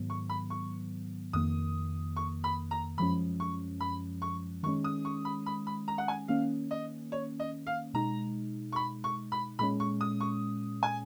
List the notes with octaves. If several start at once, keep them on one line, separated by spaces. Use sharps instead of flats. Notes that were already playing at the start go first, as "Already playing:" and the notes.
Already playing: G#2 D#3 F#3 B3
C#6
B5
C#6
F2 D#3 A#3 D#6
C#6
B5
A#5
F#2 F3 G#3 C#4 B5
C#6
B5
C#6
D#3 G#3 C#4 C#6
D#6
C#6
B5
B5
B5
A#5
F#5
G#5
D#3 A#3 C#4 F5
D#5
C#5
D#5
F5
B2 G#3 D#4 A#5
C#6
B5
C#6
B5
A#2 G#3 C#4 B5
C#6
D#6
C#6
G#5